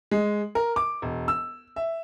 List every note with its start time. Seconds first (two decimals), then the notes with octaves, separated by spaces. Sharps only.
0.11 G#3
0.55 A#4
0.76 D6
1.02 E1
1.28 E6
1.76 E5